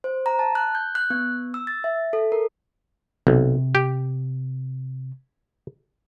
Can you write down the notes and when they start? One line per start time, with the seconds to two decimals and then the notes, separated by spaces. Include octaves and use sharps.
0.04 C5
0.26 A#5
0.39 A5
0.55 F#6
0.75 G6
0.95 F#6
1.10 B3
1.54 E6
1.67 A6
1.84 E5
2.13 A4
2.32 A#4
3.27 B1 C3
3.75 G4